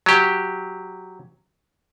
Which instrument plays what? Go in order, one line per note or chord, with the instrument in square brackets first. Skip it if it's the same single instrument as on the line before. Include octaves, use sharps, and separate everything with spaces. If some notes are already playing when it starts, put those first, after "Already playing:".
[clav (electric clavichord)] F#3 G4